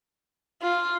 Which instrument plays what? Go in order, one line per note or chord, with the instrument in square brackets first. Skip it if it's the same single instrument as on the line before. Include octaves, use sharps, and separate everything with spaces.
[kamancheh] F4